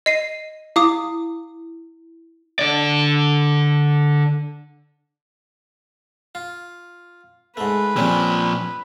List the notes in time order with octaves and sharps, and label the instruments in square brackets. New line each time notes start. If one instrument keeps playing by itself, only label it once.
[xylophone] D#5 C7 D#7
[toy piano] E4 [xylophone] F5 D6 D#6
[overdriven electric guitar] D3 D5
[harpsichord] F4
[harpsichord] G#2 A3 [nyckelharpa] B4
[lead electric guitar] A#2 F3 [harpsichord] G3 C4 C#4